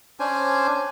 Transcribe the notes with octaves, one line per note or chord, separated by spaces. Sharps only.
C#4 D4 C5 G#5